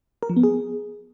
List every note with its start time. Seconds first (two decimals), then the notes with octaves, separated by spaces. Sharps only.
0.23 A#4
0.30 F3
0.36 B3
0.43 G#4